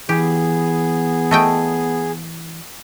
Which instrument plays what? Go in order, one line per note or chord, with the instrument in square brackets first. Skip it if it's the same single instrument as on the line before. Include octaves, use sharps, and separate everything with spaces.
[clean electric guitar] E3 [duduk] B3 [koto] G4 [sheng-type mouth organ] G#4
[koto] A3 D#5 G5